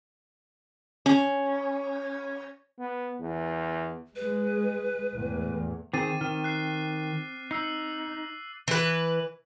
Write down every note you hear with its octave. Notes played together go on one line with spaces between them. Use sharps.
C#4
B3
E2
G#3 B4
E2 A2
D#3 C4 G#4 D6 A6 D#7
D#3 F6 D#7
F#6 C7
D#4 E6 C7
E3 B4